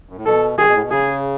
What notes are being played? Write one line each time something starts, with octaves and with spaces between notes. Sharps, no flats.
F#2
A2
B2 A4
D#3 G#4
B2
A2
B2
C#3 G#4